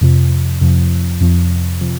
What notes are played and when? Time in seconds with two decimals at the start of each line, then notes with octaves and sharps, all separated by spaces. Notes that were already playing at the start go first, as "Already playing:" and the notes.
0.01 F2 C3 F3
0.61 F2 C3 F3
1.21 F2 C3 F3
1.81 C3 F3